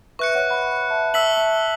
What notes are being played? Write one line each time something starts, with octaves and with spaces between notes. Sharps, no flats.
B4 E5 C#6 F#6 C#7
C#5 F#5
F#5 B5
E5 A5
E5 A5 E6 B6 F#7
E5 A5